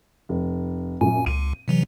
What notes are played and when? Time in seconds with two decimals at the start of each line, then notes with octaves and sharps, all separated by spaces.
0.29 F1
1.01 F#2 A#2 G#5
1.26 C#2 D#7
1.68 C3 E3 F#3